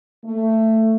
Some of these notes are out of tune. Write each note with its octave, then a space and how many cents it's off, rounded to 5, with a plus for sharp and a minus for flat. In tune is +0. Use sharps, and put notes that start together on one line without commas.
A3 +15